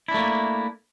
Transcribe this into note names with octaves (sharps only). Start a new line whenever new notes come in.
A3 A#3 D4 E4